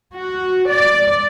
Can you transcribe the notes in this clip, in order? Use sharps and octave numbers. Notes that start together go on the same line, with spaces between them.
F#4
D5